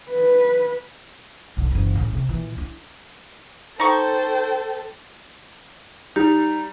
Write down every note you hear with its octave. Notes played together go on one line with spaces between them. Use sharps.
B4
B1 D3
F#1 E2
A2 C#3
C3
A#2 E3
D4 E4
D#4 A4 C5 G5 C#6
G3 D#4